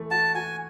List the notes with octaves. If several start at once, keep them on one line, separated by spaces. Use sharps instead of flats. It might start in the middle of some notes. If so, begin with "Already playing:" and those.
Already playing: E3 A3
F#4 A5
F#4 G#5